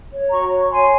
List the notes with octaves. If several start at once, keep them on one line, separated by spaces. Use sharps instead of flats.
C#5
F#4 A#5 C#6
C#5
C#5 G#5 C6